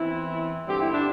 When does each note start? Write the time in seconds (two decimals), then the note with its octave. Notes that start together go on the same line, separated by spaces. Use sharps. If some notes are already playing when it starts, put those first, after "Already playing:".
Already playing: E2 E3 C4 E4
0.67 G2 D3 G3 C4 G4
0.80 E4
0.94 D4